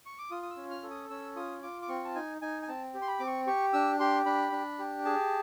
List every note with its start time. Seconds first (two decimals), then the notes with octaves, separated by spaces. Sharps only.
0.06 C#6
0.18 D6
0.31 F4 D#6
0.43 D#6
0.51 E6
0.56 C#4
0.70 F6
0.83 A4
0.91 D#6
1.10 C#4 E6
1.36 F4 D#6
1.63 F4 D6
1.82 D6
1.88 C4 C#6
2.05 A5
2.15 D#4 G#5
2.42 D#4 G#5
2.62 G#5
2.68 C4 A5
2.94 G4
3.02 C6
3.08 B5
3.20 C4 D6
3.27 C#6
3.47 G4 C#6
3.73 D4 E6
4.00 G4 C6
4.26 D4 B5
4.52 D4
4.79 G4
5.05 G#4 A5